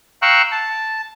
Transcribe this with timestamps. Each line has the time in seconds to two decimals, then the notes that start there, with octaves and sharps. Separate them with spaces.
0.22 F5 G5 A#5 C#6 E6 F#6
0.52 A5